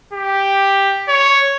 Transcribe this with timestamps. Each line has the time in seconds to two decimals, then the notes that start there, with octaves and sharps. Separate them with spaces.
0.13 G4
1.08 C#5